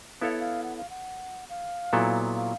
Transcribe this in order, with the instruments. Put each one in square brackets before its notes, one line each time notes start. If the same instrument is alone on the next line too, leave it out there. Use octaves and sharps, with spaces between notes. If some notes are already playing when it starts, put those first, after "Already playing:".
[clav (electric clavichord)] B3 E4 A4 C#5 [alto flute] F5
[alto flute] E5
F5
F#5
F5
F#5
F5
[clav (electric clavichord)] A#2 F#3 B3 E4 A4
[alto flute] F5